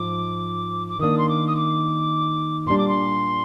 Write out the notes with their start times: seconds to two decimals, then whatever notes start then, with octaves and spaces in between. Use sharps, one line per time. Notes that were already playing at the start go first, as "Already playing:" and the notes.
Already playing: G#2 F3 D6
0.89 D6
0.99 D#3 A#3 D4 D#6
1.18 C6
1.29 D6
1.47 D#6
1.56 D6
2.67 A#2 G3 D4 C6
2.78 D6
2.88 C6